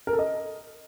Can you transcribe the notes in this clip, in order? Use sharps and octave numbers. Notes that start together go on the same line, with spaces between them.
A#4
A4
D#5